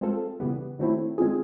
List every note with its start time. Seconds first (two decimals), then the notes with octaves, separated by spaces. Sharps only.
0.01 G#3 C4 F4 A4
0.40 C#3 E3 G3 B3
0.79 D#3 F#3 A3 C4 E4
1.18 D#3 G#3 C4 F4 G#4